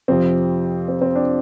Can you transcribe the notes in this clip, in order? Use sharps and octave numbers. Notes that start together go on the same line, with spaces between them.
F2 C3 F3 C4
C4
C4
D4